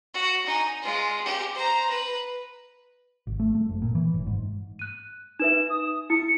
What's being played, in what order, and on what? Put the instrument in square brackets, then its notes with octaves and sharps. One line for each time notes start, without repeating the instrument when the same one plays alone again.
[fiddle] F#4
D#4 G#5
G#3 F4
G4
C5 A#5
B4
[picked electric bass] G#1
A3
A3
F#1
A#2
E3
G1
G#2
[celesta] F#6 D#7
[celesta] D#4 B4 E5 [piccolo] E7
[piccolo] D#6
[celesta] E4 [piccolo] C#7